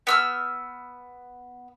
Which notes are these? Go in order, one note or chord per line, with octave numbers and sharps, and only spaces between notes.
B3 E6 F6